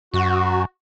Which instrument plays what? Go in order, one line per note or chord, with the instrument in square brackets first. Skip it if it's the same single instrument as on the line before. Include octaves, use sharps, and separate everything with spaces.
[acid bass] F#2 [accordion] F#4